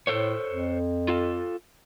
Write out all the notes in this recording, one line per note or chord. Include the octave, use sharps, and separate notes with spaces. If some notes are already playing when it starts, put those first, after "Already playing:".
A2 A4 C5 C#5
F2
F4 A4